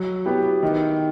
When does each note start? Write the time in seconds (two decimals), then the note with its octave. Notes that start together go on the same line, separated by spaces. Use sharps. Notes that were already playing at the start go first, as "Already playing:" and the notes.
Already playing: F#3
0.26 B3 E4 G4
0.63 D#3